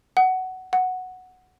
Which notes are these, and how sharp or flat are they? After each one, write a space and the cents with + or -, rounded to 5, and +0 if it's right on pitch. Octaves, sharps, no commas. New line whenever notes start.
F#5 +15
F#5 -5